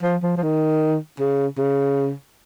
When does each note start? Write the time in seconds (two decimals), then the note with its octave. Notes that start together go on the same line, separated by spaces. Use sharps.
0.03 F3
0.23 F3
0.37 F3
0.43 D#3
1.20 C#3
1.58 C#3